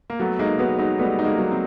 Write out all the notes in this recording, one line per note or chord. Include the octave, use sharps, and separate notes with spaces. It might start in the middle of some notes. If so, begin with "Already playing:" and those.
A#3
F#3 A3 B3
G#3 A#3 D#4
F#3 G#3 B3
F#3 G#3 D#4
G3 A3 B3
D#4
G#3 A#3
F#3
C4